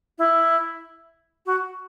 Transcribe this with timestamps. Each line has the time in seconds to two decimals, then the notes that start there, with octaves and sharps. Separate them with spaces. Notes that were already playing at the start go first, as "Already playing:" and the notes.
0.18 E4
1.46 F#4